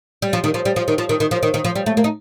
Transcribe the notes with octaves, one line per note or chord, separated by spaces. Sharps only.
G3
F3
D#3
F3
G3
F3
D#3
F3
D#3
D#3
F3
D#3
D#3
F3
G3
A3
A#3
D#4